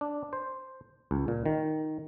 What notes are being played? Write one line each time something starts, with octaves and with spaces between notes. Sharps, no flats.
D4
C5
C#2
A#2
D#3